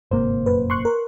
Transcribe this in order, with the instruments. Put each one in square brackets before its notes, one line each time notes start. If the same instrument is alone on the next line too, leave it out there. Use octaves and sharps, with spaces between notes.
[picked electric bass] G1 G#2 C3 [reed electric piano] A#3 C5
[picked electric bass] F1 F#2 A#2 [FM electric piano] B4
[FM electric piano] C6 C#6 F#6
A#4